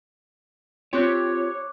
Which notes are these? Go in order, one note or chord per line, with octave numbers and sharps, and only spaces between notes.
C4 F4 G4 C#5 C#6 D6 F#6